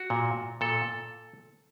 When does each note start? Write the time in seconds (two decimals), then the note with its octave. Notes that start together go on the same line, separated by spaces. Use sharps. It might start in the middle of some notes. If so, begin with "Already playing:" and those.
Already playing: F#4
0.10 A#2
0.61 A#2 A4